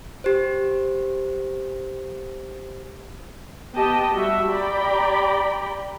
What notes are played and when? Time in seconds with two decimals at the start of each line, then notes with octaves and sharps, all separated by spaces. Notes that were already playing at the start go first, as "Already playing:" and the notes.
0.24 G4 C5
3.76 B3 G4 D#5 G5 A5
4.13 G3 F#4 E5
4.49 G4 D5 G5 A#5 B5